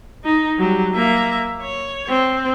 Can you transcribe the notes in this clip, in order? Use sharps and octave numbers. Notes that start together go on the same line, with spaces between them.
D#4
F#3 G3
A#3 E5
C#5
C4